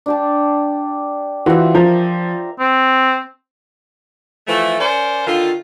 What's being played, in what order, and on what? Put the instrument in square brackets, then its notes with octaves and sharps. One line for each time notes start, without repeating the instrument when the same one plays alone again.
[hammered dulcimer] D4 G4 A5
[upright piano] E3 F#4 [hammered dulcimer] F4 C5 E5
[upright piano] F3 [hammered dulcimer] G4 A#4 C5
[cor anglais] C4
[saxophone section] E3 F3 A3
C#4 A#4 C5 D5
D3 D#3 F4